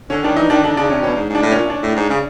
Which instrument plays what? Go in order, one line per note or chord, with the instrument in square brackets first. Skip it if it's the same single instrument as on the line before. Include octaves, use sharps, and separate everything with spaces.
[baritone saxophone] D3 [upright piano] C#4
[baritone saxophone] D#3 [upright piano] D4
[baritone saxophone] E3 [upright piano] D#4
[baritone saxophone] D#3 [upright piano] D4
[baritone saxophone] D3 [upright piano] D4
[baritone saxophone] C#3 [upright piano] D4
[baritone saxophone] C3 [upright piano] C#4
[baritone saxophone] B2 [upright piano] C#4
[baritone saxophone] G#2
G#2
[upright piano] D4
[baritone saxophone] A2
[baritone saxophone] A#2 [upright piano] C#4
[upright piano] D4
[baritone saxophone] A2
G#2
C#3